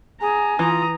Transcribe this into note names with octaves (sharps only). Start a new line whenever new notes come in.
G#4 G#5 A#5
E3 F4 A#5 D#6